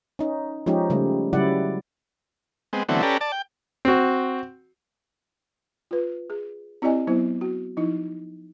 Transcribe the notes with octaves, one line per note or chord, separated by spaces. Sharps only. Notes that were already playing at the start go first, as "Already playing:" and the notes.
C#4 D#4
F3 G#3 C#4 D#4 G4
C#3 G3 A3
C#3 F#3 G3 E4 D5 F#5
G#3 B3 C4
D3 E3 F#3 A3 B3 C4
C#4 G4 A4 B4 D5 A#5
D5 A5
G5
C4 F#4
F4 B4
G#4
C4 E4 G4 D5 D#5 G#5
F#3 B3 E4 C5
F#4
F3 D#4 E4